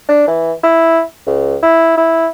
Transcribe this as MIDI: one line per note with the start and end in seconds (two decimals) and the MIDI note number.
0.09 0.25 62
0.27 0.52 52
0.63 1.02 64
1.27 1.56 37
1.63 1.97 64
1.97 2.29 64